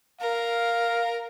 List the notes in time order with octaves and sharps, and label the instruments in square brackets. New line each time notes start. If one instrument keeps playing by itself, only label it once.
[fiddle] A#4 [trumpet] F5